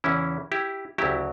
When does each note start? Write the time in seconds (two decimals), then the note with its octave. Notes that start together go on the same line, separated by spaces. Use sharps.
0.04 E2 C#3 E3 C#4 E4
0.52 E4 G4
0.98 D2 C#3 F#3 E4 G4